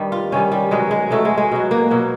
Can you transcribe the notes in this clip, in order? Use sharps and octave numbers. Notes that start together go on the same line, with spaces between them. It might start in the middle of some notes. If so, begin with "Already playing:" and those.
Already playing: G2 D#3 G3
F4
G2 D#3 G3 C#4
G3
B2 F#3 G#3
G#3
B2 F#3 A3
G#3
G#3
B2 F#3
A#3
B2 F#3